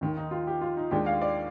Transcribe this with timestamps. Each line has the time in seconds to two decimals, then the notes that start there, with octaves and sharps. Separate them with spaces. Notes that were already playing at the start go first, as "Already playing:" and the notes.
0.01 D#2 D#3 A#3
0.17 D#4
0.31 F4
0.47 G4
0.61 F4
0.77 D#4
0.91 D#2 D#3 G#3 D4 G4
1.06 F5
1.22 D5